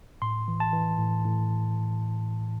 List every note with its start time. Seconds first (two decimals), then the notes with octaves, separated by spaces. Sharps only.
0.22 A2 C6
0.48 E3
0.60 A5
0.73 E3
0.99 A2
1.25 A2